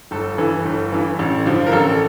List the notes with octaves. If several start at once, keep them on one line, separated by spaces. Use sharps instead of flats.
G1 A4
G2 E3
G1
G2 E3
A1
G2 D3 F3
A#4
A1 A4